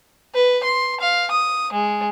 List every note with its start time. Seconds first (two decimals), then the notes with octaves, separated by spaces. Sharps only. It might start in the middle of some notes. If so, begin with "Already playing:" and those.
0.35 B4
0.64 C6
1.00 F5
1.31 D#6
1.73 G#3